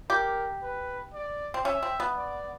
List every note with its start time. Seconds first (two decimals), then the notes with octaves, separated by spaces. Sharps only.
0.10 G4 A#4
0.62 B4
1.14 D5
1.54 C4
1.65 C#4 E5
1.83 C4
2.00 B3
2.17 D5